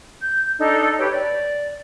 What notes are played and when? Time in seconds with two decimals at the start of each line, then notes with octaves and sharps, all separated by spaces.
0.21 G6
0.58 D4 D#4 A4
0.97 G4 B4 C#5 G5
1.12 D5